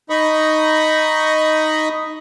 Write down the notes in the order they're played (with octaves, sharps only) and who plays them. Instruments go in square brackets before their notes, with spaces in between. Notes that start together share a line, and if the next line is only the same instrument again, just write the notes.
[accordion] D#4 D#5 B5 C#6 D#6